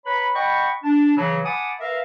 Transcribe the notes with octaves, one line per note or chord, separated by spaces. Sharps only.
B4 C#5 A#5 B5
D#5 F#5 G5 B5 C#6
D4 A5
C#3 E3 F#3
F#5 G#5 A5 B5 D6 D#6
A#4 B4 E5 F5